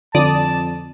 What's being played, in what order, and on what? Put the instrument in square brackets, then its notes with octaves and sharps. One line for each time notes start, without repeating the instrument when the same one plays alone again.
[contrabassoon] F2 [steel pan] D3 [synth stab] D5 D#6 [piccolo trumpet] A5